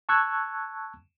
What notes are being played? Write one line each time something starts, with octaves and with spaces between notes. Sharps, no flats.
A5 C#6 E6 F#6 G#6